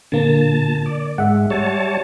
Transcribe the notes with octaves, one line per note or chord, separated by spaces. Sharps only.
A#2 D3 A#3 A5
D5
G#2 G#3 E5 F#5
G3 C#5 A5